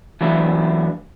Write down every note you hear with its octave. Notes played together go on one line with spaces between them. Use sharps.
E3 F#3 A3 B3 D4 E4